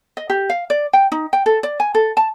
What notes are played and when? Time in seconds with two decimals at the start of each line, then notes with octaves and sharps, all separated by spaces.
0.17 D#5
0.30 G4
0.50 F5
0.70 D5
0.93 G5
1.12 D#4
1.33 G5
1.46 A4
1.63 D5
1.80 G#5
1.95 A4
2.17 A5